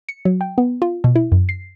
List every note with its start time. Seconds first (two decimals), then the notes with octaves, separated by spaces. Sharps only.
0.09 C#7
0.25 F#3
0.41 G5
0.58 B3
0.82 F4
1.04 B2
1.16 E4
1.32 F#2
1.49 C7